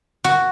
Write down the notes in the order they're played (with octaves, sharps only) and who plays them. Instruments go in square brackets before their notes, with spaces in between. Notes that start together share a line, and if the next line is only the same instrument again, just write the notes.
[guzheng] F#4